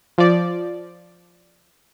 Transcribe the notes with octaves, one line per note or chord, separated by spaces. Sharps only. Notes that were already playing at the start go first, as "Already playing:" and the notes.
F3 D5